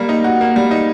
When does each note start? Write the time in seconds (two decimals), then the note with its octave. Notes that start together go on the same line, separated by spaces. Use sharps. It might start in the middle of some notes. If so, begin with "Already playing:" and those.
Already playing: G3 A#3
0.09 D#4
0.24 F#4
0.41 A#3
0.56 G3
0.71 D#4